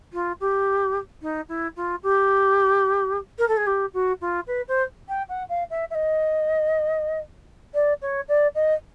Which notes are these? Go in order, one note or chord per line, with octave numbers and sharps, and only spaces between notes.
F4
G4
D#4
E4
F4
G4
A#4
A4
G#4
G4
F#4
F4
B4
C5
G5
F#5
F5
E5
E5
D#5
D5
C#5
D5
D#5